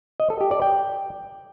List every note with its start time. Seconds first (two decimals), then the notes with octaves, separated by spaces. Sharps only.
0.20 D#5
0.30 A4
0.41 G4
0.51 D5
0.62 G5